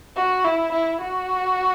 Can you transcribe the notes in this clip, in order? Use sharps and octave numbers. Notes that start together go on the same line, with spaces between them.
F#4
E4
E4
F#4